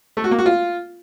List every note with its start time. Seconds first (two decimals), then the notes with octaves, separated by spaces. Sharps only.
0.17 A3
0.24 F#4
0.31 A#3
0.39 F#4
0.46 F4